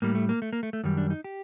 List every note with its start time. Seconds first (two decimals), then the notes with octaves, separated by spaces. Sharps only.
0.02 A2 G3 A#3
0.15 A3
0.29 A#3
0.42 A3
0.53 A#3
0.63 A3
0.73 A3
0.84 F#2 D#3 G3
0.97 D4
1.10 D#4
1.24 G4